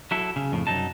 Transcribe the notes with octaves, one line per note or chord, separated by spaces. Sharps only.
F#3 E4 A4
C#3
F2 A2 C#3
C2 F#2 F3 F#3 D#4 A5